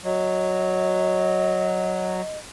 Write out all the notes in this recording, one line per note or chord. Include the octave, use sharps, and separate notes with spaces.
F#3 D#5